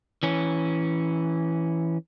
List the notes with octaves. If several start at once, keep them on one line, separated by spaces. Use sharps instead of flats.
E3 C#4